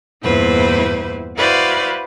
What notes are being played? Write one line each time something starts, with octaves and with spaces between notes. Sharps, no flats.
E2 G2 A#2 E4 B4 C5
E4 F#4 B4 C5 D5 F5